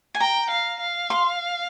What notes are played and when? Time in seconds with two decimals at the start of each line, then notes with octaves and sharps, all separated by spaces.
0.15 G#5
0.20 G5 A#5
0.50 F5
0.80 F5
1.10 C6